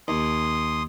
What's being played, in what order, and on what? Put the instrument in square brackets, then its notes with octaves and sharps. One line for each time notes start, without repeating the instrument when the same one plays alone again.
[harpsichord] D#2 [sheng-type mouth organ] C6 D#6